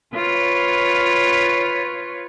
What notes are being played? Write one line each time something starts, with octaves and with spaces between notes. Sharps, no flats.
F4 B4 C#5